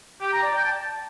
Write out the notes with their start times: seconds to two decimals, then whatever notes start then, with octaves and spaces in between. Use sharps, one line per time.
0.21 G4
0.32 A#5
0.43 D5
0.54 G5
0.65 A5